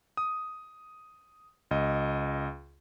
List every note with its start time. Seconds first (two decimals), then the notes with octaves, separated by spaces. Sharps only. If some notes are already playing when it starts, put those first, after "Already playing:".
0.17 D#6
1.71 C#2 D#5